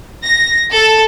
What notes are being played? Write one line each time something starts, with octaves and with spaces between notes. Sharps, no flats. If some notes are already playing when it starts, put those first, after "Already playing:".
A#6
A4